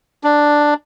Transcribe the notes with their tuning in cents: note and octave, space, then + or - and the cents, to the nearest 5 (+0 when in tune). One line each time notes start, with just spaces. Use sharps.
D4 +5